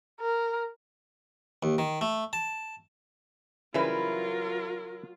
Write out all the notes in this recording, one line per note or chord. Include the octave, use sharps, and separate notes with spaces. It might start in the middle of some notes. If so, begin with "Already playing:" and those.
A#4
D#2
D#3
A3
A5
C#3 E3 F#3 G3 E4 F4 A#4 B4